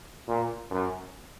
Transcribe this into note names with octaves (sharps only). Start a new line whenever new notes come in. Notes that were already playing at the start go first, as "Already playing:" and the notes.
A#2
F#2